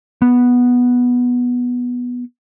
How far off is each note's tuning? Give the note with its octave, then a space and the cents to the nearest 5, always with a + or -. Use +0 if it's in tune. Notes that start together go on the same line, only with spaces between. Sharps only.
B3 -5